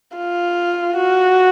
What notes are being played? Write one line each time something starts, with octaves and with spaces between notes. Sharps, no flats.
F4
F#4